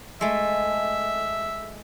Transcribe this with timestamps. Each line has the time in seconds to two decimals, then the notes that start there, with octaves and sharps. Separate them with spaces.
0.21 G#3 A3 E5